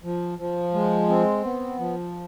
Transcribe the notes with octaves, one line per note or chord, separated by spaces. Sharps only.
F3
F3
G#3
C4
B3
F3